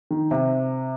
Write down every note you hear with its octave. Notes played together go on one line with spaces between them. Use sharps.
D#3
C3